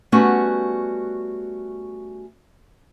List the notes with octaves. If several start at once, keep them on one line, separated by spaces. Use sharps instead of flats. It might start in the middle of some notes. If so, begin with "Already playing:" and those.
G3 A3 B3 C#4 F#4